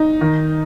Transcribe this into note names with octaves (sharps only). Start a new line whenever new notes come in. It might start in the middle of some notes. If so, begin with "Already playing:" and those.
Already playing: D#4
D#3